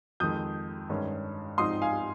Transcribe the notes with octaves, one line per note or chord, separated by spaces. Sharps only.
F2 D#3 G#3 D#6 G6
G2 D#3 G#3 C#4
G#2 F3 C4 D#4 C6 D#6
F5 G#5